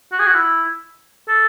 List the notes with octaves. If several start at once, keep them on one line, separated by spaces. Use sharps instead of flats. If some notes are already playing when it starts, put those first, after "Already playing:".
F#4
G#4
F#4
E4
A4